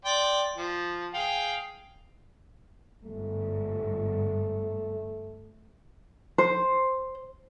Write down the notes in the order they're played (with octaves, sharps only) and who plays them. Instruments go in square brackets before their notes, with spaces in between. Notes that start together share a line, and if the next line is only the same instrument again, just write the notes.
[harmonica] D5 G5 C6
F3
G#4 F5 G5
[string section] G1 G#2 [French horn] A3
[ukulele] C5